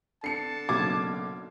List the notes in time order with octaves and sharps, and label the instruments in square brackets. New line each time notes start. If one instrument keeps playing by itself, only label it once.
[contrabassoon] D3 [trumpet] A5 [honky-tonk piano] C7 C#7
[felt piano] F#1 B1 [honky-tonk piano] D6 G#6 C7